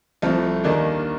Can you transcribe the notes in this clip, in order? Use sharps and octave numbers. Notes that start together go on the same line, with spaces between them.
C2 C3 F3 A3 A4
D#2 D#3 A#3 D4